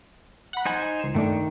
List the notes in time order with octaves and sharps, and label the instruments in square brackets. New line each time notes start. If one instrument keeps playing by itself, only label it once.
[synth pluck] F#5 B5
[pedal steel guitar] D#4 C5 G#5
[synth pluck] C#2 C7 E7
[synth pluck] G2 A3 D4 [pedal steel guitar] D#3